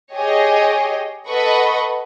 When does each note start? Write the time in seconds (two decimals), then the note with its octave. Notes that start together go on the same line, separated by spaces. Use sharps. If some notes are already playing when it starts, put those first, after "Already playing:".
0.13 G4 G#4 C#5 D#5
1.28 A4 B4 D#5 F#5 B5 C#6